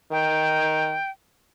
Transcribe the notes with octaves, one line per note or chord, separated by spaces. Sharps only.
D#3 G5